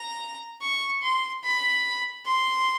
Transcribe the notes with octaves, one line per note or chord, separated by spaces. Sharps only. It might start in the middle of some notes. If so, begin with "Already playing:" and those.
Already playing: A#5
C#6
C6
B5
C6